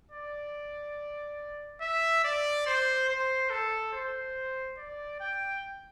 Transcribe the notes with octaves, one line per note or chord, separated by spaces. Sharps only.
D5
E5
D5
C5
C5
A4
C5
D5
G5